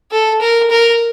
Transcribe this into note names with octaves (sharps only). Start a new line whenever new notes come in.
A4
A#4
A#4